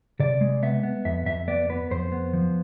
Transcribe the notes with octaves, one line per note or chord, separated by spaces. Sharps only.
C3 D5
G#3
B3 E5
B3
F2 E5
F2 E5
B3 D5
B3 B4
F2 C5
B3
F3